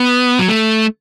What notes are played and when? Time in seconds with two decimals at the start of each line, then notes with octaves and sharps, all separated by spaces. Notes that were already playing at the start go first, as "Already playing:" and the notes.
Already playing: B3
0.39 F#3
0.48 A3